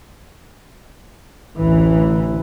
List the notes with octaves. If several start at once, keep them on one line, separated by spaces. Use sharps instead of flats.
A1 D2 E3